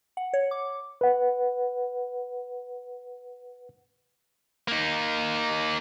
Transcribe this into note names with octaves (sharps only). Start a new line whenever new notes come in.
F#5
C#5
D6
B4 F#5
A#3 D#4